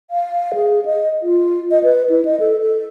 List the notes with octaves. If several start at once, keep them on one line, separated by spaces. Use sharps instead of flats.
F5
G#4
D#5
F4
D#5
B4
E4
D#5
A4
A4